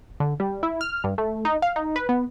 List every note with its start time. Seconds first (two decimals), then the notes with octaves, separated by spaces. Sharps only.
0.20 D3
0.40 G3
0.63 E4
0.81 F6
1.04 G2
1.18 A3
1.45 D#4
1.62 F5
1.76 D#4
1.96 B4
2.09 B3